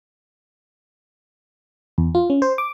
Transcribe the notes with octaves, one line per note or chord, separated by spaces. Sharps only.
E2
F4
C#4
C5
D6